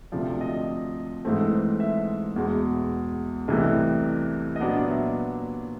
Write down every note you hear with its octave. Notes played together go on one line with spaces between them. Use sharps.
D2 C3 F3 D5
D#5
G#2 E3 A3 C4
E5
E2 B2 G#3
C2 C3 E3 A3 D#5
D#5
A#2 F#3 B3 D4 D5
E5